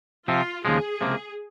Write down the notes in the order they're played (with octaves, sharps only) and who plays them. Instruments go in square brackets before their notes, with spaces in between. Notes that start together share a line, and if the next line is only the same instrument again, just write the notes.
[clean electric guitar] C3 F3 C4 [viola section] F4
[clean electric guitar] D#2 C#3 F3 G#3 [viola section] G#4
[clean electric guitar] C#2 C3 F3 A#3